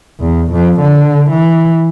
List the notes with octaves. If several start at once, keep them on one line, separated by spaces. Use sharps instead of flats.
E2
F2
D3
E3